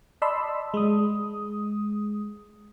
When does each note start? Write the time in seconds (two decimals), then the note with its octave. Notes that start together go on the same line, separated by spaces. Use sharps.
0.22 D5 D#5 A5 B5 C6 E6
0.74 G#3 D#6